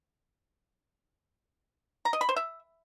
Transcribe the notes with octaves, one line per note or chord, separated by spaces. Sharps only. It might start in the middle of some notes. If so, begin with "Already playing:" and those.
A#5
D#5
B5
C5
E5